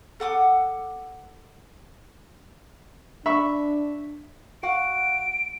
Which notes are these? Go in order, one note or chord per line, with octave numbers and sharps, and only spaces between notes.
A4 F#5 D6 D#6
D4 E5 B5 C#6
F#4 F5 F#5 D7